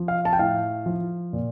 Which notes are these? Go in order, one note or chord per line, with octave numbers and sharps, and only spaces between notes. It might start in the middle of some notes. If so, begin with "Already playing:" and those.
Already playing: F3
F5
A5
G5
A2 F5
F3
A#2